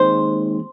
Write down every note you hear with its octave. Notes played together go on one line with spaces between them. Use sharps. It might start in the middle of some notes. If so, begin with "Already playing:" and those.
Already playing: D#2 D#3 G#3 C4 C5